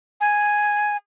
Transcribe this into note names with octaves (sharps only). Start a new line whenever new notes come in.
G#5